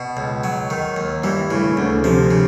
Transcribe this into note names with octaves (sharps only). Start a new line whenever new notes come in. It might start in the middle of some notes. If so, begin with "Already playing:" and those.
Already playing: B2
C#2
F#3
D#3
D#2
G2 E3
A2 C#3
D2 D3
C3 F3
C#3